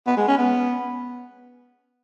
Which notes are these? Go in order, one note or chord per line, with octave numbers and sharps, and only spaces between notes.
B3
G#3
C#4
B3